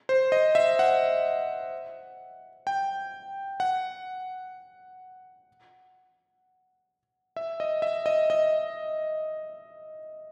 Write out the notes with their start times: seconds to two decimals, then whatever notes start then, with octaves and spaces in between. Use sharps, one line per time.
0.09 C5
0.32 D#5
0.55 E5
0.79 F#5
2.67 G5
3.60 F#5
7.36 E5
7.60 D#5
7.82 E5
8.06 D#5
8.30 D#5